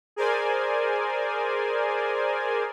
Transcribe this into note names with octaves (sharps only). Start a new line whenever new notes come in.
G#4 A#4 C5 D5 G#5